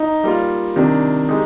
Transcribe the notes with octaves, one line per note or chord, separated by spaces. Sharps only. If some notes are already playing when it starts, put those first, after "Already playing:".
Already playing: D#4
G3 A#3 F4
C3 D#3 G3 D4
G#3 D#4 G4